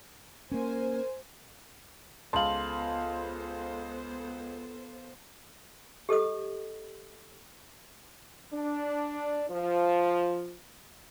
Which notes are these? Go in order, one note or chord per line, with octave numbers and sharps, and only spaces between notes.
A#3 C#4 A#4 C5 G#5
C#2 B3 A4 C5 F5 A5 C6 F#7
G4 A4 D#5 D#6
D4
F3